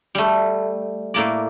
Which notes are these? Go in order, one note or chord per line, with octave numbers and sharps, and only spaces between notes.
G3 A3
A2 A#3 D5